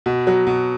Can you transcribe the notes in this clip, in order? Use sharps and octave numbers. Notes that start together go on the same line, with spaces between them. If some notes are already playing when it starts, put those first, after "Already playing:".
B2
F#3
B2